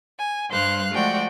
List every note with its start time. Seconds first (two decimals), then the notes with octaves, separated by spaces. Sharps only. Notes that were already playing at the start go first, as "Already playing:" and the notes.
0.19 G#5
0.49 G2 G3 C5 F5 F#6
0.93 F3 G#3 A3 F#4 D5 G5